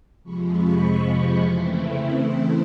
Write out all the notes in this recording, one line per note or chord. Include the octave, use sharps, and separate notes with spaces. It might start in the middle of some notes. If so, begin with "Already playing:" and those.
F2 C3 F3 G#3 B5 C#6
B5 C#6
C#3 E3 A3 C4 E4 C6 D6